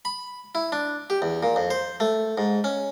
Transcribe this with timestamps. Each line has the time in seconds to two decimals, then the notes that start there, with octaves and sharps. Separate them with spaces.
0.05 B5
0.55 E4
0.72 D4
1.10 G4
1.22 E2
1.43 A#2
1.56 F2
1.70 C5
2.00 A3
2.38 G#2
2.64 C#4